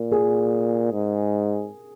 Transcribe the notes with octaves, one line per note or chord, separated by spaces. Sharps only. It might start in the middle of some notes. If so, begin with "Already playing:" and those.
Already playing: A#2 A#4
G#4
G#2